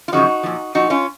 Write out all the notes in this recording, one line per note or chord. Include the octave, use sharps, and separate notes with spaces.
F4
F#2 C#3 F3 D#4 F#4
A#2 F3
A#2 F3 D#4 F#4
C#4 F4